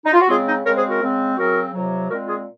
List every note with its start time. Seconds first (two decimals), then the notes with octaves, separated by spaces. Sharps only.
0.05 D#4
0.13 F4
0.20 F#4
0.28 C#3 G#3 C4 F4 G#4
0.46 D#4
0.64 C#3 G#3 C4 A#4 C#5
0.76 G#4 C5
0.88 F#4 A#4
1.01 C#3 G#3 C4
1.37 C#3 F#3 C4 F#4 A#4
1.73 F2 C3 F#3
2.09 A#2 G#3 C4 F#4 A#4
2.27 F4 G#4